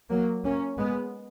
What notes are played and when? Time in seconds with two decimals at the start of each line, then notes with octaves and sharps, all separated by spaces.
0.10 F#3 A#3
0.44 A#3 C#4
0.78 G#3 B3